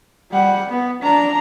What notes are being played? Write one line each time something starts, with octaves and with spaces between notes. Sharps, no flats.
G3 F#5
B3
D4 A#5